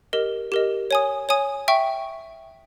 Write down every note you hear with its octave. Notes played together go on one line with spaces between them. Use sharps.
G4 A#4 D#5
G4 A#4 D#5
C#5 G#5 D#6
C#5 G#5 D#6
E5 G5 C#6